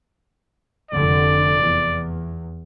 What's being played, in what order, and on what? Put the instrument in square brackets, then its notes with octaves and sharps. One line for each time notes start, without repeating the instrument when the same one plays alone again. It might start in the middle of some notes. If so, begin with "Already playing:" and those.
[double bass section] F1 D3 [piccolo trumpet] D5
[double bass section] E2